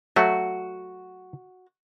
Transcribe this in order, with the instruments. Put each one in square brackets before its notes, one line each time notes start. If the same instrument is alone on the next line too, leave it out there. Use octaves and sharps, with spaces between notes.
[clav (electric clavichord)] F#3 A3 [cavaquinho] F#4